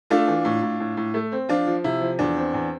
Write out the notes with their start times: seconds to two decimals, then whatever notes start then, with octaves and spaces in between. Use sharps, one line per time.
0.10 A3 D4 F4
0.28 E3
0.45 A2
0.62 A2
0.80 A2
0.97 A2
1.14 A3
1.32 C4
1.49 F3 D4 F4
1.67 F3
1.84 C3 E4
2.01 F3
2.19 E2 D4
2.36 C4
2.54 E2